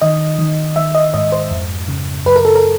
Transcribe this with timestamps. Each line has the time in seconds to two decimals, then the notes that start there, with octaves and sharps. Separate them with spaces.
0.01 D#3 D#5
0.39 D#3
0.76 D#3 E5
0.95 D#5
1.14 G#2 D#5
1.32 C5
1.51 F2
1.88 C#3
2.26 F#2 B4
2.36 A#4
2.45 A4
2.55 A#4